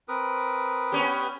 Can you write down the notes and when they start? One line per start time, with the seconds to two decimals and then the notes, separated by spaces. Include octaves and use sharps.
0.08 C4 A#4 B4 D#6
0.92 B3 C#4 G4